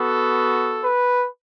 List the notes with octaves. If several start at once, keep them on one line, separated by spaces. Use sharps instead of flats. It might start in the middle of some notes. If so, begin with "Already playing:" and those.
Already playing: B3 F#4 A4
B4